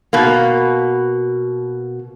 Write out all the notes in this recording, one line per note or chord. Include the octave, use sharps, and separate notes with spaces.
B2 A#3